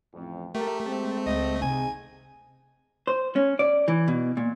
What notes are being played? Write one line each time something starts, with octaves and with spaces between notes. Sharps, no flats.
A1 F2
A3 G4 A#4
G#3 C4
C#2 D#5
C3 D#3 C4 D#4 G#4 G#5
C5
C#4
D5
E3
B2
A#2